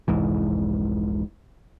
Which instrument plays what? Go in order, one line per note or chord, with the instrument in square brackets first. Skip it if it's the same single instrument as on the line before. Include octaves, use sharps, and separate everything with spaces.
[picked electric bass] F1 C2 G#2 E3